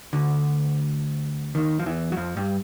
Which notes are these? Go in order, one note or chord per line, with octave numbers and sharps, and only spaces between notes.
D2 D3
D#2 D#3
F3
E2 E3
F#3
F2 F3
G2 G3